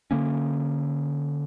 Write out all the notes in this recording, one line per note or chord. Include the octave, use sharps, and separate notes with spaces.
D3 F3 A#3 C#4